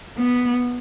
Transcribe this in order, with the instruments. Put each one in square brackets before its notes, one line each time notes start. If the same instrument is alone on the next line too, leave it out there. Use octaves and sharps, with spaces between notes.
[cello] B3